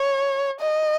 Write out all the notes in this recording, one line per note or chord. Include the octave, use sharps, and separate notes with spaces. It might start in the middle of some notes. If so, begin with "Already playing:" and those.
Already playing: C#5
D#5